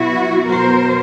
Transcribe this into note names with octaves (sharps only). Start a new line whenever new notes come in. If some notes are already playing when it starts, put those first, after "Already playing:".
Already playing: B2 F#3 B3 E4 F#4
B2 F#3 B3 A#4 C5